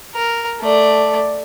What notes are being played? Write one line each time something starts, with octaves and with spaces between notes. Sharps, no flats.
A#4
A3 D5